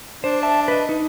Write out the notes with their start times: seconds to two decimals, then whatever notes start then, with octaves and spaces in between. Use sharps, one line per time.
0.24 D4 C5
0.43 E5 A5
0.68 B4 D#5
0.89 D#4